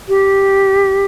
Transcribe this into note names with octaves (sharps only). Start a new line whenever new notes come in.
G4